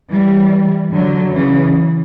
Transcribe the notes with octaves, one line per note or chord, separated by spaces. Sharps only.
E3 G3
D3 F#3
C#3 E3